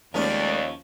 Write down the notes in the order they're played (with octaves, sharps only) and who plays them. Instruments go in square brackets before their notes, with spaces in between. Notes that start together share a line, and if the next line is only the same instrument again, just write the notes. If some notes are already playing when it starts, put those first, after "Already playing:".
[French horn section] D#2 [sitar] F3 C#4 [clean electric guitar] G#3 A3 A#4 [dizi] D5